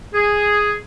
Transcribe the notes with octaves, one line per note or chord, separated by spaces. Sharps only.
G#4